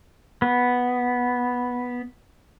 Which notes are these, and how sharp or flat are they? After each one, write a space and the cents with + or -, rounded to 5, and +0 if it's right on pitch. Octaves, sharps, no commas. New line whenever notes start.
B3 -5